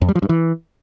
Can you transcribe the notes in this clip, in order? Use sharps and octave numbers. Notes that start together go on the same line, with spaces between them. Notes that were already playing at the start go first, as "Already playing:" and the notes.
F2
G3
F3
G2
E3